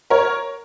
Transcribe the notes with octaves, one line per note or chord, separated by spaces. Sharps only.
A#4 C#5